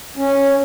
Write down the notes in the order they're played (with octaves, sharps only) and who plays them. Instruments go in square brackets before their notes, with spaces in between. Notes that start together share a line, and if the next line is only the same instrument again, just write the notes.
[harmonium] C#4